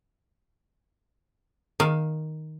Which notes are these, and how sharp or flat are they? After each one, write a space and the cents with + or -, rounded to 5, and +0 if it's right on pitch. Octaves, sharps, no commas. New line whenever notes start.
D#3 +0 F5 +0